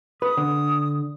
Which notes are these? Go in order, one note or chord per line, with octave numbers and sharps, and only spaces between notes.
B4 D#6
D3